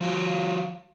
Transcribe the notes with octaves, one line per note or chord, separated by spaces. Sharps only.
F3 F4 F#4 F5